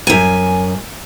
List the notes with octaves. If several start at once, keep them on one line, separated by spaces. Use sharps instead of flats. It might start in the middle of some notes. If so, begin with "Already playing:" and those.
F#2 G#5